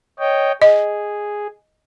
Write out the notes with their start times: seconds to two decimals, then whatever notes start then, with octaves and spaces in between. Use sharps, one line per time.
0.19 C#5 D#5 G5
0.62 G#4 D#5